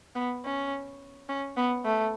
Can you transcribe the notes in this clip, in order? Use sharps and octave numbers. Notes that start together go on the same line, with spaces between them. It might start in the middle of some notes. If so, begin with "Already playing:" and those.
B3
C#4
C#4
B3
A3